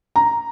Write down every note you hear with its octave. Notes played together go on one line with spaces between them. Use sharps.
A#5